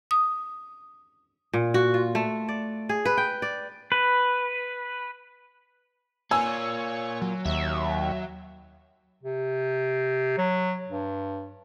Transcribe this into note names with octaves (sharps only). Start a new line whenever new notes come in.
D#6
A#2
F#4
F4
A3
D5
G#4
B4
G5
D5
B4
A#3 F4 C#5 G#5 E6
F#3
D#2 E5
C3
F#3
G2